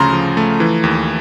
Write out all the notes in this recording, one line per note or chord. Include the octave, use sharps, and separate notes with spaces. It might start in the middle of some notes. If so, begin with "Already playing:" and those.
Already playing: D2 C#3 F3 A3 A#5 C6
F3
A3
E3
D#2